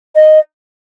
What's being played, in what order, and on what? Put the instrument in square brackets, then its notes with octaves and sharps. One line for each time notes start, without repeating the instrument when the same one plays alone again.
[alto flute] D#5